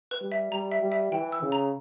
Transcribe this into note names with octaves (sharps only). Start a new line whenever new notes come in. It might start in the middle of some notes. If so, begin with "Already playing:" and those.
B4
G3
E5
G3 A#5
E5
G3
E5
E3 G5
E6
C#3
A#5